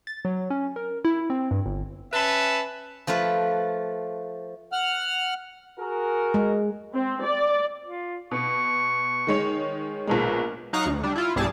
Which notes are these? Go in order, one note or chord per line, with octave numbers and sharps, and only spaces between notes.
A6
F#3
C#4
A#4
E4
C4
G2
G1
C#4 B4 E5 A5 B5
F3 A3 F4 B4
F#5 F6
F#4 G#4 A#4
G#3
C4
D5
F4
B2 C#6
D#3 G#3 C#5
A#1 B2 G#3 A#4
F#3 D#4 F5 A#5 C#6 F#6
D2
G3 D4
E4 F4
B1 G2 G3 E4 G#4 A5